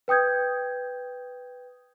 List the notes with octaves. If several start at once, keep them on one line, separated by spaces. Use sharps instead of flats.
B4 G5 D#6 G6 G#6